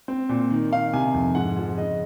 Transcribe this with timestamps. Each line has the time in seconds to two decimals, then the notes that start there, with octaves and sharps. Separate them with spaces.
0.08 C4
0.29 A#2
0.50 D#3
0.71 D#3 F5
0.93 C3 G#5
1.14 F2
1.35 G#2 F#5
1.57 F3
1.77 C#3 D#5